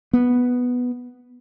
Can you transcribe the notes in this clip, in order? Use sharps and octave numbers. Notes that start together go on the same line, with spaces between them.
B3